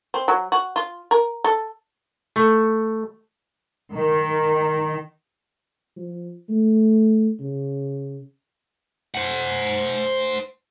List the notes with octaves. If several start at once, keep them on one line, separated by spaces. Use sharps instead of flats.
C4
F#3
F#4
F4
A#4
A4
A3
D#3
F3
A3
C#3
C5 F#5